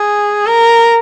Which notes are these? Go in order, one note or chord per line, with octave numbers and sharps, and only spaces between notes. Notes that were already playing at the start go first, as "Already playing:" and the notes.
Already playing: G#4
A#4